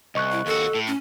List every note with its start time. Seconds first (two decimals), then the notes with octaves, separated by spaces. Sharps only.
0.15 C2 D#5 C#6 F#6
0.32 E4
0.46 D#2 F#4 A4
0.75 A2
0.87 C#4